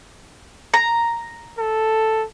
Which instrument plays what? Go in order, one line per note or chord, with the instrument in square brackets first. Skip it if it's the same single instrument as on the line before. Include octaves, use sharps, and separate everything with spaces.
[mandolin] A#5
[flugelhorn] A4